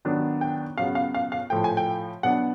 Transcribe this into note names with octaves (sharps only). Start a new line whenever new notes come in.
D#3 F#3 B3 D4
G5
C#3 F#3 B3 F5
F5
F5
F5
A2 F3 A3 G5
G#5
G5
B2 F#3 B3 D4 F#5